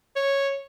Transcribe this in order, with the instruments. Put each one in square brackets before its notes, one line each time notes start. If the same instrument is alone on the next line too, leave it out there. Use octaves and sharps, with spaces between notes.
[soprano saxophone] C#5